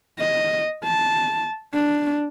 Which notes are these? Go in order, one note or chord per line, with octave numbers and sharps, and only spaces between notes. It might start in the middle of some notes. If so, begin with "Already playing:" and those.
D#5
A5
D4